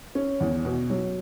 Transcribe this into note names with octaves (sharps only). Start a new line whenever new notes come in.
C#4
E2
B2
F#3